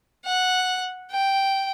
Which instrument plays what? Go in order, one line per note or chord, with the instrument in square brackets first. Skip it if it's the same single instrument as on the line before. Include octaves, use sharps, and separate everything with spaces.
[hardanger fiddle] F#5
G5